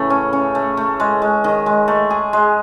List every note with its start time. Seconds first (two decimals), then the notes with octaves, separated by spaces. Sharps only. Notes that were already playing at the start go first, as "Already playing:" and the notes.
Already playing: A2 C#3 E3 A3
0.10 C#4
0.33 C#4
0.55 A3
0.77 A3
1.00 G#3
1.22 G#3
1.44 D#3
1.66 G#3
1.88 A3
2.10 G#4
2.33 G#3